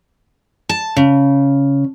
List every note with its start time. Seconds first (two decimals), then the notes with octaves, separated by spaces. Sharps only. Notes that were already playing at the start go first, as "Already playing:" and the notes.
0.69 A5
0.96 C#3